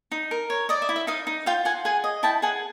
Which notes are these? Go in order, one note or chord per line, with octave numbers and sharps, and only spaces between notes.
D#4
A#4
C#5
D5 D#5
E5
E4
E5
D#4 D#5 F5
D#4
F4 F5 G5
F4 F#5 G#5
G#4 F#5 G#5
D#5
E4 G5 A5
G#4 F#5 G#5